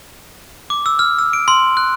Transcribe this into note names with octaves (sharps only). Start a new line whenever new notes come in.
D6
E6
F6
E6
D7
C6
F#6